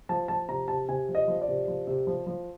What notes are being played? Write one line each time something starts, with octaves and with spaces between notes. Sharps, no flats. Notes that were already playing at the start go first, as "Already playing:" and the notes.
F3 A5
F3 A5
C3 A#5
C3 A5
C3 G#5
F3
D#5
F3
D5
C3
F3
C3
F3
F3